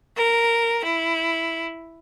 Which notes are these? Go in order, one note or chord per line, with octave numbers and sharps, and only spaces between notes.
A#4
E4